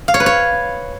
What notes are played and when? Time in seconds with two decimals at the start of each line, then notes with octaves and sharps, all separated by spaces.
0.08 F5
0.14 C#5
0.20 B4
0.26 C#5